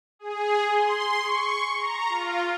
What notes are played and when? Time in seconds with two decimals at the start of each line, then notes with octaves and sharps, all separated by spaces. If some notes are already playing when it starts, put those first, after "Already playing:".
0.19 G#4
0.70 C6
1.19 C#6
1.77 A#5
2.09 F4